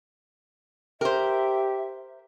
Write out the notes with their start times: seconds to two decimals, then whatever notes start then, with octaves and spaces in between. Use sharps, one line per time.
1.01 G4 A#4 C5 E5